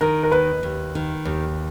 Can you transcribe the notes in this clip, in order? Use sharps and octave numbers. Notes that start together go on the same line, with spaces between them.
D#3 A#4
A#4
D#2 B4
D#2
D#3
D#2